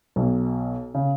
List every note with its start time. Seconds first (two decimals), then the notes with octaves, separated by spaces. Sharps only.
0.16 B1 B2
0.94 C#3